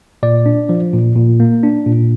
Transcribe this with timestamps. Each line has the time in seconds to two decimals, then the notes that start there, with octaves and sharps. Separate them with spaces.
0.23 A#2 D5
0.46 D4
0.69 F3
0.93 A#2
1.16 A#2
1.40 A#3
1.63 D4
1.87 A#2